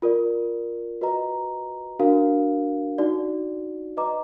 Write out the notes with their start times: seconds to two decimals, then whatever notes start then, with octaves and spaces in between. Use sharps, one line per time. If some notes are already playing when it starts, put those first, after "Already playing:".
0.02 F4 A#4 D5
1.01 F#4 B4 D#5 A#5
1.99 D4 F#4 A#4 F5
2.98 D#4 F#4 D5
3.97 B4 D#5 A#5 D6